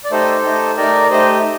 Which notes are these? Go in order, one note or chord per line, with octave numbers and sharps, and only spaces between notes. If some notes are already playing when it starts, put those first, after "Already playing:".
D5
A3 D#4 G4 A4 C5
A3 D#4 G4
A3 D#4 G4 A#4 D5
A3 D#4 G4 C5 D#5